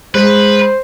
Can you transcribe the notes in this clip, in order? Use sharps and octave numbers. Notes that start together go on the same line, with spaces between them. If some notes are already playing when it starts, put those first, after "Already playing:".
G#3 B4 C5